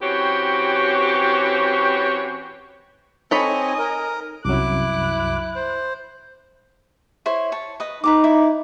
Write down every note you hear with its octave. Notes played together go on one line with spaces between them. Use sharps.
E3 C4 C#4 F#4 G4 C#5
C4 D#4 A4 C#5 D#5 G#5 B5
A#4
C2 F#2 F#3 E4 D6 F#6
C5
E4 C5 C#5
C#5 A5
B4 D#5
D#4 B4 A#5 D6
E4 D5 D6